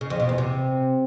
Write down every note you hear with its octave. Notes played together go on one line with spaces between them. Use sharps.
C#3
F2
B2
E2
C3